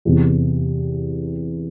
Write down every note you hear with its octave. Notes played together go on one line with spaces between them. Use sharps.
E2 C3 E3